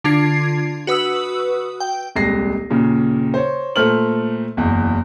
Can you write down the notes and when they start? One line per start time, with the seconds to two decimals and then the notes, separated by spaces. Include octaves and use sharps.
0.04 D3 D4 F4 G#6 C7
0.87 F#4 B4 D#6 E6
1.80 G5
2.16 D#1 C2 G#3 A#6 C7
2.70 D#2 A#2 C#3
3.34 C5 C#5
3.76 A#2 A3 C5 F6 F#7
4.57 F#1 E2